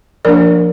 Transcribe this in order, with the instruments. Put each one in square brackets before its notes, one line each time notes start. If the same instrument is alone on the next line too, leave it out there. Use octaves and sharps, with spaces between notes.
[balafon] F3 A#3 D4 A#4 D5